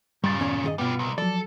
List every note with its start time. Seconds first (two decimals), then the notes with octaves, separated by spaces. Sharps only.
0.24 G2 A#2 C#3 G3 A6
0.40 E2 C#4 D5
0.64 D#3 G#4 D#5
0.78 B2 G3 B3 F4
0.99 C2
1.18 F3 F#3 A4 D5